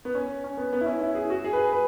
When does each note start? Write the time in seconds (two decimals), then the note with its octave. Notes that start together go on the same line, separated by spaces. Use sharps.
0.05 B3
0.15 C#4
0.44 C#4
0.57 B3
0.73 B3
0.81 E4
0.86 C#4
1.01 E4
1.15 G#4
1.30 F#4
1.44 G#4
1.53 B4
1.58 G#4
1.73 B4